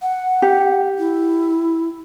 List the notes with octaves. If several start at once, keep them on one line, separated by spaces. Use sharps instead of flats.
F#5
G4
E4